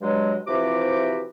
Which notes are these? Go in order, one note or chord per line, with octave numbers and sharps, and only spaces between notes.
G2 F#3 G#3
C3 E3 F3 F#4 G4 D6